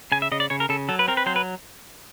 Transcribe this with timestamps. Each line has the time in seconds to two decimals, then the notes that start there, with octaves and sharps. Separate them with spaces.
0.12 C#3 G#5
0.22 E5
0.32 C#3 D#5
0.40 D5
0.50 C#3 C#5
0.60 A#4
0.69 C#3 A4
0.89 F#3 A4
0.99 B4
1.08 C4 A#4
1.17 B4
1.26 F#3 C5
1.36 B4